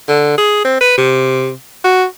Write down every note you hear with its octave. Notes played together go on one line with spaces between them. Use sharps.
D3
G#4
C4
B4
C3
F#4